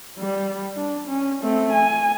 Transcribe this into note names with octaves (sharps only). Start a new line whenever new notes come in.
G3
D4
C#4
A3 C4
G#5